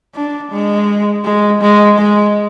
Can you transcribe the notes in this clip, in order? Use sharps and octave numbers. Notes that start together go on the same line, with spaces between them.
D4
G#3
G#3
G#3
G#3